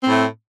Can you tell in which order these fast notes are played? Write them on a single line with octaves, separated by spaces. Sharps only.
C4 A2 A3